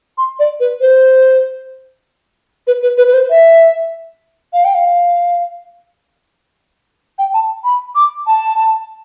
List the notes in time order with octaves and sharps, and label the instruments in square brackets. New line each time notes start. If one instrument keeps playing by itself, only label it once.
[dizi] C6
D5
B4
C5
B4
B4
B4
B4
C5
E5
F5
G5
F5
G5
A5
B5
D6
A5